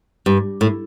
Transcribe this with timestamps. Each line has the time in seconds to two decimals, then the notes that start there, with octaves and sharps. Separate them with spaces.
0.26 G2
0.61 A2